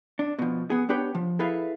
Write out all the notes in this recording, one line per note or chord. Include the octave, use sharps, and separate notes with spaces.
D4
B2 F3
B3 G#4
B3 D4 G4 B4 C#5 G5
F3
E4 G#4 A4 B4 E5 F5